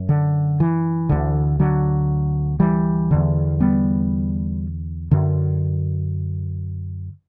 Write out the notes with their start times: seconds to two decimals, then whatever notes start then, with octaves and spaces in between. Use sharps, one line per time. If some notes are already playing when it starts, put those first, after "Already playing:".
Already playing: F#2
0.09 D3
0.60 E3
1.09 D2 D3
1.60 D3 F#3
2.60 E3 G3
3.11 E2 D3
3.60 G3 B3
5.11 F#2 D3